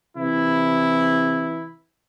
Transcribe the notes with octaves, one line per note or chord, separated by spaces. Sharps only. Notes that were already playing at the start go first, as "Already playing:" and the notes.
C3 E3 E4